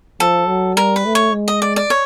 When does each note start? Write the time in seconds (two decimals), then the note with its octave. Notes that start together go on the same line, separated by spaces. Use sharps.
0.20 F3 A4
0.48 F#3
0.77 G3 A#4
0.96 B4
1.06 A3
1.15 C#5
1.33 G#3
1.48 D#5
1.62 D5
1.76 D5
1.90 C#5